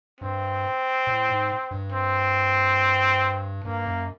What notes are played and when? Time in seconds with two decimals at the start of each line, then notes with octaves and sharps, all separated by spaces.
0.20 G2 C4
1.07 A2
1.29 G#2
1.71 G2
1.92 C4
3.64 G2 A#3
3.86 F#2